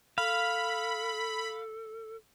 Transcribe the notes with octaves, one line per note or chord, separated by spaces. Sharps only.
A4 F5 B5